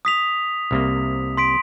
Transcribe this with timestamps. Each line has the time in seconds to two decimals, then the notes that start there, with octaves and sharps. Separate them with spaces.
0.05 D#6 B6 F7
0.71 C2 C3 A#3
1.37 C6 B6 D7